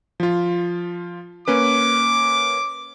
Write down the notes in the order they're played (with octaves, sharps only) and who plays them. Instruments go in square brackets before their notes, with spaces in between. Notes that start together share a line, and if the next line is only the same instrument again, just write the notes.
[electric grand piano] F3 F4
[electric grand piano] A#3 C#4 B4 [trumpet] D6